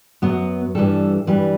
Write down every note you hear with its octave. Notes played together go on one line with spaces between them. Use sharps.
F#2 F#3 B3
G2 E3 G3 A4
G2 E3 G3 B4